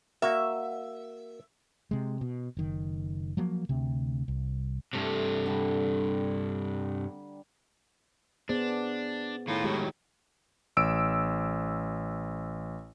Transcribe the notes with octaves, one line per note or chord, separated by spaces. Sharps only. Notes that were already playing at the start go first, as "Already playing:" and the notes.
A#3 F#4 E5
C3 G#3
B2
F#1 D#3
F3 F#3 A#3
D2 C3
C2
G2 C3 A3
D3 G3 A#5
B3 D4 G#4 C5
A2 D#3 F4
D#3 F#3 G#3 E4 G4
A1 E6 D7